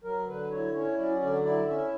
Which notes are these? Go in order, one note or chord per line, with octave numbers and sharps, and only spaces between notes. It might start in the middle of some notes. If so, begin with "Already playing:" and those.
F#3 A#4
D3 B4
E4 C#5
C#4 C#5
F#3 D5
D3 D5
E4 D5
C#4 E5